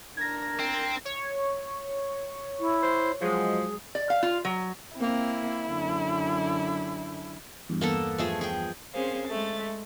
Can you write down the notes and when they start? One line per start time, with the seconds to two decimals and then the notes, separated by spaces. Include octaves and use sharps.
0.17 D4 A#4 G#6 A#6
0.60 C4
1.05 C#5
2.60 E4
2.82 C5
3.21 F3 F#3 G#3 G#4
3.95 D5
4.10 F5
4.23 F4
4.45 F#3
4.97 A#3 C4 E4
5.68 F#2 D3
7.69 E2 G2
7.81 A#3 B3 A4
8.18 F3 A3 G#4
8.41 G#4 G5
8.94 C4 C#4 G#4 A#4 C5 F5
9.27 G#3 A3 A6